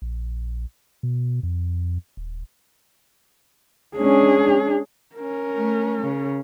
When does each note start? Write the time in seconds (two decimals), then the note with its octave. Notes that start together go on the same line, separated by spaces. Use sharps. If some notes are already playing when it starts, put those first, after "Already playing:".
0.02 A#1
1.03 B2
1.43 F2
2.17 D#1
3.97 G#3 C#4 D4 G#4
5.16 C#4 A#4
5.56 A3
6.01 C#3